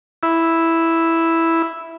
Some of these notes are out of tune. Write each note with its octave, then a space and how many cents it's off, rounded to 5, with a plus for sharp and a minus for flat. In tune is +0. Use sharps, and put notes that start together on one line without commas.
E4 +0